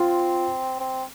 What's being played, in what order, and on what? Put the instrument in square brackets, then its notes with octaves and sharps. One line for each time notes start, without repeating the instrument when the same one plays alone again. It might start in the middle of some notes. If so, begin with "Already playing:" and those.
Already playing: [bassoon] C4 [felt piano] F4
[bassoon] C4